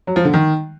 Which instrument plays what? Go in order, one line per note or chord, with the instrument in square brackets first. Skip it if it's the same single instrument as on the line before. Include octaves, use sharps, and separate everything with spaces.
[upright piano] F#3
F3
D3
D#3